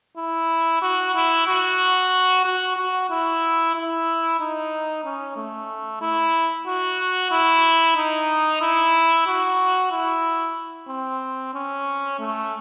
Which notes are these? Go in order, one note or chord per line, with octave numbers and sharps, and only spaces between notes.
E4
F#4
E4
F#4
F#4
F#4
E4
E4
D#4
C#4
A3
E4
F#4
E4
D#4
E4
F#4
E4
C4
C#4
A3